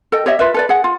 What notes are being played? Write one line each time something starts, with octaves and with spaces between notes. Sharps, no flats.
A4 D#5 G5
G4 C#5 D#5 E5
F4 B4 E5
A4 B4 D5
G#4 F#5
F4